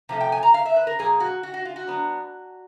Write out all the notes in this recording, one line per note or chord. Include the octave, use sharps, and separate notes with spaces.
C3 F3 A3
G5
G#5
A#5
F5
E5
B4
A#4
A#2 F3 A#3 G#4
F#4
F#4
F#4
F4
F#4
F#3 B3 D4